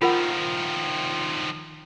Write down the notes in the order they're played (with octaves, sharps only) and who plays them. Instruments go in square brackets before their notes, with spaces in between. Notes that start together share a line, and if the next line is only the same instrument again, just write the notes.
[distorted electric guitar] D#3 F3 [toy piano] F4 A#4 F#5